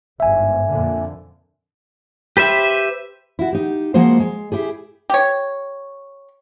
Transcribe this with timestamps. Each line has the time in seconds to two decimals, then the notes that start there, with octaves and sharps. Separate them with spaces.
0.20 G1 G#2 E5 G#5
0.69 F2 A#2 D3
2.37 G4 B4 C5 E5
3.39 E4 F#4
3.53 D#4 G4
3.94 F3 G#3 A#3 F#4 C5
4.20 G#3
4.52 E4 G4 G#4
5.10 G4 C#5